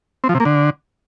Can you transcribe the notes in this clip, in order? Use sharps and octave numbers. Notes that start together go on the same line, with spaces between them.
C4
F3
C3
A#3
D3